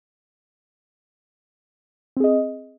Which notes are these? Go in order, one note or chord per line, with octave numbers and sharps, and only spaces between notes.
C4 G#4 D#5